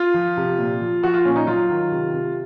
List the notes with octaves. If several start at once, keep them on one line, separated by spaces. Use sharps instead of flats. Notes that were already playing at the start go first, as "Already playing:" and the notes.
Already playing: F4
F3
C3
A#2
F3
F3 F#4
F4
A#2 C#4
D#4
F#3 F4
D#3
C3
C3